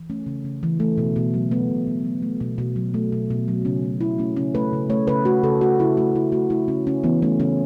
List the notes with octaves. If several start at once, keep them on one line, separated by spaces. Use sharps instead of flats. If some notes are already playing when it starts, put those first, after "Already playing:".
Already playing: E3
A3 C#4
C#3
C#3
E3
A3
B2
B2
F#3
A3 B3
B2
B2
F#3
A3
B2
B2
F#3
A3
B2
B2
F#3
C#3 C#4
A3
C#3 E4
A3 C#4
C#3 C#4
A3 B4
C#3
A3 C#5
C#3 B4
A3 F#4
C#3 A4
A3 F#4
C#3 E4
A3 F#4
C#3 E4
A3 F#4
A3 E4
C#3 C#4
C#3 C#4
E3 B3
A3 C#4
C#3 C#4